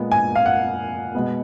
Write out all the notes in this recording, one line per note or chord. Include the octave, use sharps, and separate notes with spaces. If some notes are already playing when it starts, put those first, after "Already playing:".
Already playing: A#2 G#3 B3
G#5
F5
F#5
B2 G#3 B3